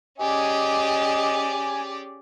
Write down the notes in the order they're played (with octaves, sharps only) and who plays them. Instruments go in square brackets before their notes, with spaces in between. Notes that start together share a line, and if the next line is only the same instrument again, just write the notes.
[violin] C#4 G#4 [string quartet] G4 D5 [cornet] D#5 [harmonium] G#5